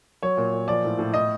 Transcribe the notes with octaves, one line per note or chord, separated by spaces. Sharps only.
F#3 C#5
A#2
A#2
F3 D5
A2
A2
A2 D#5